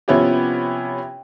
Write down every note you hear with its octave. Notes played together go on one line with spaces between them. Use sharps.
C3 F3 B3 C#4 E4 G4